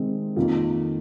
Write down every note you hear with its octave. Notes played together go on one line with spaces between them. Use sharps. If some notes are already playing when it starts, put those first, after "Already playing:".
Already playing: C3 D#3 G#3 C4
F2 D#3 A#3 F4